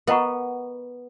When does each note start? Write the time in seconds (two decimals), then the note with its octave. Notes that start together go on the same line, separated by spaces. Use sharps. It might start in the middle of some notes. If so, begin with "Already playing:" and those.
0.07 B3 A#4 D#5 F#5 A#5 C#6